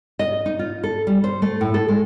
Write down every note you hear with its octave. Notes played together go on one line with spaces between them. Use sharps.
D#5
D#4
F4
A4
G3
C5
A3
A2
A4
G#3